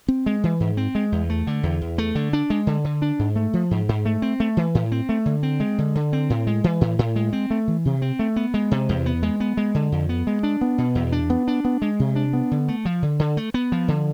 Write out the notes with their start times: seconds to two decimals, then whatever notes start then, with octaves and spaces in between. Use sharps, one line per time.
0.08 C4
0.26 G#3
0.44 E3
0.60 G#2
0.77 C4
0.95 G#3
1.12 E2
1.30 A3
1.47 D3
1.63 E2
1.82 E2
1.98 A3
2.15 D3
2.33 D4
2.50 G#3
2.67 D3
2.85 D3
3.02 D4
3.19 G#2
3.36 A3
3.53 F3
3.71 G#2
3.89 G#2
4.05 A3
4.22 C4
4.40 A3
4.57 E3
4.75 A2
4.92 C4
5.09 A3
5.26 D3
5.43 C4
5.60 G#3
5.78 D3
5.95 D3
6.13 C4
6.30 A2
6.47 G#3
6.64 E3
6.81 A2
6.99 A2
7.16 G#3
7.33 C4
7.50 A3
7.68 E3
7.85 C3
8.02 C4
8.19 A3
8.36 B3
8.54 G#3
8.71 C3
8.89 E2
9.06 B3
9.23 G#3
9.40 B3
9.57 G#3
9.75 D3
9.92 F2
10.09 B3
10.27 G#3
10.43 D4
10.61 B3
10.78 B2
10.95 E2
11.12 D4
11.30 B3
11.48 D4
11.65 B3
11.82 G#3
11.99 C3
12.16 D4
12.33 B3
12.51 D3
12.68 A3
12.85 F3
13.02 D3
13.19 D3
13.37 A3
13.54 B3
13.72 F3
13.88 D3